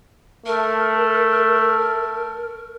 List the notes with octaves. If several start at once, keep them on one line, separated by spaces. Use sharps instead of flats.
A3 A#4